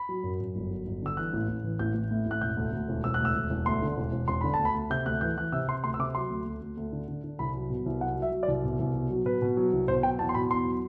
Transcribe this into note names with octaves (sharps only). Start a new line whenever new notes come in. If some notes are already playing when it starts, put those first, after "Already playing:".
Already playing: B5
F#3
F#2
F#2
G1
F#3
G1
D3 E6
E3 F#6
A1
A1
E3
A1 G6
A1
A2
A1 F#6
E1 G6
D2
D2
E1
E1 E6
F#6
D2
E6
E1
E1
D2 C6
D3
E1
E1
E1 C6
D3 B5
A5
D2
B5
D2
C3 G6
D2 F#6
E3 G6
E3 F#6
C3 E6
C3 C6
D2 C6
E6
C3 D6
F#3 C6
D2
D2
D2
D2
D3
D3
D3
C2 B5
F#3
B2
C2
F#3 F#5
F#3
E5
F#3
D5
C2
B2
C2
B2
F#3
B2 B4
B2
F#3
C2
B2 C5
F#3 G5
E2 A5
C6
B2 B5
E2 C6
F#3